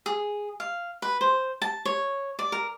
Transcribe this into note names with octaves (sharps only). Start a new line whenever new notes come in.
G#4
F5
B4
C5
A5
C#5
D5
A#4